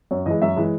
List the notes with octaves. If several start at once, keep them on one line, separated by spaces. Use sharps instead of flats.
F#2 C#5
E3 G#3 D#5
F#2 E5
E3 G#3